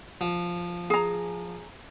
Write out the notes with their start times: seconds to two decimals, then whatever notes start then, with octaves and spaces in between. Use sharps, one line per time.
0.21 F3
0.90 G#4 A#5